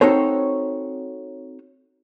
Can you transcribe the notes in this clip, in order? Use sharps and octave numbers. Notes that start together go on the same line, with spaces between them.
C4 D#4 F#4 A4 C5 C#5